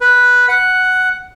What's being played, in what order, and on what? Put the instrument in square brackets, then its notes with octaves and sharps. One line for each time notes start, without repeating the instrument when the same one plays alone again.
[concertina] B4
F#5